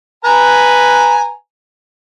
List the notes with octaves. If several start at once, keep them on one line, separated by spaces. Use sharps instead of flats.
B4 G#5 A#5